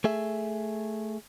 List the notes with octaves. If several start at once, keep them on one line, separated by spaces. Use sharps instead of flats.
A3 G#4 E5